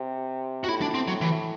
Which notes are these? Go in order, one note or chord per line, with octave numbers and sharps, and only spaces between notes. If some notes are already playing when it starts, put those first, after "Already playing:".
Already playing: C3
F#4
A2 E4
D4
C4
F#3
E3